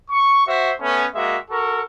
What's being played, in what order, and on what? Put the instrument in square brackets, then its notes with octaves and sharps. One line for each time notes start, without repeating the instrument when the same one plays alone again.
[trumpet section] C#6
F#4 C5 E5
A3 B3 C#4
G#3 A#3 F#4 E5
F#4 A4 A#4 C#6